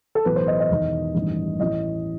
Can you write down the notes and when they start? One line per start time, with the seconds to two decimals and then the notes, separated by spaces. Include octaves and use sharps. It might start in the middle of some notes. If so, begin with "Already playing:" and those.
0.15 A4
0.25 B1 A2 E3 B4
0.36 C5
0.47 D#5
0.59 D#5
0.70 E1 E2 D#3
1.15 A1 G2 D#3
1.60 A1 A2 E3 D#5